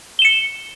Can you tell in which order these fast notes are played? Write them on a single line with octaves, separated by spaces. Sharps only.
G7 E7 C#7